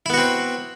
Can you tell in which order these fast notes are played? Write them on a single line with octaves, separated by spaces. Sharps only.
E4 B3 F#4 C4